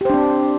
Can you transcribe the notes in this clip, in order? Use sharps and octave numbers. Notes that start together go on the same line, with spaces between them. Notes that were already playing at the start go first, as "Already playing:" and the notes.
C4 D4 G4 C5